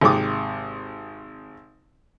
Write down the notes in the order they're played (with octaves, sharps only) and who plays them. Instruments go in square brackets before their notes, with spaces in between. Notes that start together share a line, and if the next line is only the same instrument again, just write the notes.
[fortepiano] G#1 C3 G#3 G5 D6 D#6